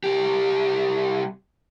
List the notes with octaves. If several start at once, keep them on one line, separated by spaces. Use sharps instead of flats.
C2 G4